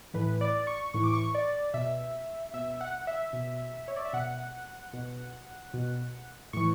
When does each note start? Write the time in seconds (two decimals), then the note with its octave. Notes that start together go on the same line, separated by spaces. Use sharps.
0.14 A2 E3 B4
0.41 D5
0.67 C#6
0.94 A2 E3 C#6
1.04 D6
1.13 C#6
1.35 D5
1.74 B2 E5
2.54 B2 E5
2.81 F#5
3.07 E5
3.33 B2
3.88 C#5
3.96 D5
4.05 E5
4.13 B2 F#5
4.93 B2
5.74 B2
6.53 A2 E3 C#6